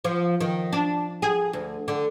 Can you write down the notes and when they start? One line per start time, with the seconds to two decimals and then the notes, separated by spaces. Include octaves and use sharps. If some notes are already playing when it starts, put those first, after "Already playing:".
0.05 F3
0.41 D#3
0.73 D4
1.22 G#4
1.53 D2
1.88 D3